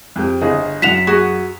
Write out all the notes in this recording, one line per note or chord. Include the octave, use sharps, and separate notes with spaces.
F2 G4
G1 G#4 D#5
F#2 F#5 B6 E7 F7
F#4 G#4